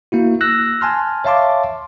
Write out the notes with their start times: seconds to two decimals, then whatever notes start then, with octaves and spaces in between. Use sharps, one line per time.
0.12 A#3 E4 F#4
0.41 E6 F#6 A#6
0.81 G#5 A5 C6 F6
1.24 C#5 E5 F5 A5 C6 D6